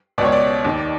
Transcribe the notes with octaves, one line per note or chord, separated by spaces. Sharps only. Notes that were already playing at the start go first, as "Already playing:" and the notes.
C#2 B2 C#5 D5
D5
D#2 D#3